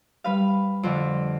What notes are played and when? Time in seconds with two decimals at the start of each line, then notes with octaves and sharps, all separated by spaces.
0.24 G3 B4 F5
0.83 F2 D3